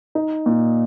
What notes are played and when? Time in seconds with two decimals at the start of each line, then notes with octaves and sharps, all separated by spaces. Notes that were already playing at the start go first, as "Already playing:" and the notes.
0.15 D#4
0.46 A#2